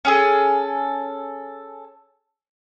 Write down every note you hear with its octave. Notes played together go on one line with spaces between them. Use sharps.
C#4 G#4 A4